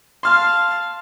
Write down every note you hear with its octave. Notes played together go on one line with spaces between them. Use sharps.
F5 A5 C6 F6